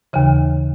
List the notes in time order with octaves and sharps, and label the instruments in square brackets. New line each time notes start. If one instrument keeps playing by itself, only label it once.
[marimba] D#2 C#3 E3